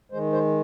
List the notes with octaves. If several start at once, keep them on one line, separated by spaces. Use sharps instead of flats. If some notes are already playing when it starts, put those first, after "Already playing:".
D#3 G#3 C5
C5